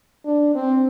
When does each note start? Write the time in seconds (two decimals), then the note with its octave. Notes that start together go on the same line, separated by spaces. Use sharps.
0.25 D4
0.55 C4